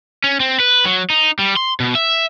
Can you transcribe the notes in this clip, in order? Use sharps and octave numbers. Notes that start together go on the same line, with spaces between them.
C#4
C4
B4
F#3
D#4
G3
C6
B2
E5